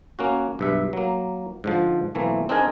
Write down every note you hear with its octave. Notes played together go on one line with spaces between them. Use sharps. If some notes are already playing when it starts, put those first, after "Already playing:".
A#3 C#4 F#4
B1 G2 E5
F#3 A#3
G#2 D3 F3
B1 E3 A3 A#3 C4
C4 D4 D#4 G#4 A#4 G#5